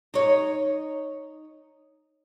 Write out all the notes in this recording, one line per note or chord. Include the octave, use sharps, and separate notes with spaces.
D#4 C#5